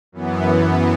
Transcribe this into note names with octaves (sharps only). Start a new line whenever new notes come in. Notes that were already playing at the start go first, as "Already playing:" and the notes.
F#2 E3 B3